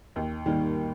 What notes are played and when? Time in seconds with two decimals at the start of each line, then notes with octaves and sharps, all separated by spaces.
0.16 D#2
0.46 D#3 G3 A#3